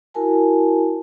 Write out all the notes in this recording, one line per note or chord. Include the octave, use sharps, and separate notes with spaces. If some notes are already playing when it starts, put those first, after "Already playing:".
E4 F#4 A#4 G#5 A5